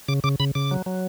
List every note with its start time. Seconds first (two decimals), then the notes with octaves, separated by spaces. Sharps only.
0.08 C#3 D6
0.24 C#3 D6
0.40 C#3 B5
0.55 C#3 D6
0.71 F#3
0.86 F#3